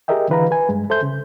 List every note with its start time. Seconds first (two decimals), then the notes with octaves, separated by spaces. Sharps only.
0.08 G4 G#4 A#4 D#5 E5 G5
0.30 D3 E3 B4 F5 A#5
0.51 B4 G#5
0.69 G2 G#3
0.90 A4 C5 E5 C6 G6
1.03 C#3